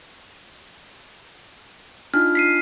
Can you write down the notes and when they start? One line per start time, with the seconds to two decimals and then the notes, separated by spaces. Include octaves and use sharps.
2.14 D4 D#4 F4 F6
2.35 B6 C7 D#7